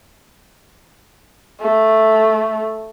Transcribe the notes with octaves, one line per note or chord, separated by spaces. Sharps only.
A3